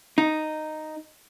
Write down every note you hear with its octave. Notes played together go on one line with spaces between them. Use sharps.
D#4